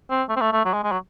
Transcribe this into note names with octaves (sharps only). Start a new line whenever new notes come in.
C4
A3
C4
A3
A3
F#3
G#3
G#3
F#3